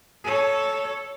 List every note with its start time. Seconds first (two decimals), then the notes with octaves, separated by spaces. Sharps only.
0.24 A4 C#5